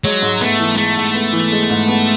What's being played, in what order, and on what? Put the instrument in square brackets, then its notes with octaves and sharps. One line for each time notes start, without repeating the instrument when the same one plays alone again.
[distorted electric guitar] F#3 [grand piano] G#3
[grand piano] G#2
[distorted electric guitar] A3 [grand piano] B3
[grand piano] E3
[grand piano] G#3 [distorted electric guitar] A3
[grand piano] G#2
B3
E3
G#3
G#2
B3